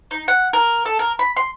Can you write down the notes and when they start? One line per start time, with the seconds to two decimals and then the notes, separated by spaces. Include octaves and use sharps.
0.11 D#4
0.28 F#5
0.53 A#4
0.85 A4
0.99 A#4
1.19 B5
1.37 C6